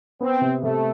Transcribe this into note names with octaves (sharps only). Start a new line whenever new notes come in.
B3 C4
C3
C3 A3